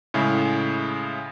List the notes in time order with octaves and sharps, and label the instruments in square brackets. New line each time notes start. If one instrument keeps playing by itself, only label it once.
[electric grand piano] A2 C#3 G#3 E4